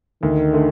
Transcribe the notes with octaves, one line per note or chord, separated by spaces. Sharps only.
D2 D#3
D3 A3